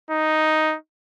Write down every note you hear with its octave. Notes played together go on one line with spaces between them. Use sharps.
D#4